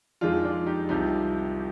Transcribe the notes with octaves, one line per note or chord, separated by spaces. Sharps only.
F2 D#3 G#3 D4 F4
D4 F4
D#4 G4
C2 C3 F3 D#4 G4